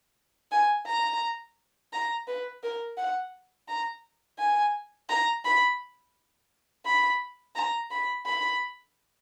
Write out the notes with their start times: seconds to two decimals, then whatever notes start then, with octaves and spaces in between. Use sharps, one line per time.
0.52 G#5
0.87 A#5
1.93 A#5
2.28 B4
2.63 A#4
2.98 F#5
3.69 A#5
4.39 G#5
5.09 A#5
5.45 B5
6.86 B5
7.56 A#5
7.91 B5
8.26 B5